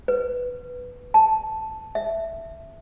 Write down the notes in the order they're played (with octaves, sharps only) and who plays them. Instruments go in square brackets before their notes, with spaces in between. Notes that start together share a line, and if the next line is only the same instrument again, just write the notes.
[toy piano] B4
A5
E5